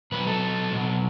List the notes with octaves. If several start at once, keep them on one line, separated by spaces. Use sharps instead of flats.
B2 F#3 B4
A4
B2 F#3